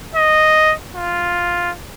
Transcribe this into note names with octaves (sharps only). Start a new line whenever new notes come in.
D#5
F4